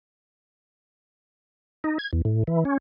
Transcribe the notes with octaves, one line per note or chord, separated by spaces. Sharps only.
D#4
G#6
E2
A2
E3
C#4